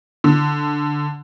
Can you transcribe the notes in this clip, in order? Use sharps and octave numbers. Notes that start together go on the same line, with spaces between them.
D3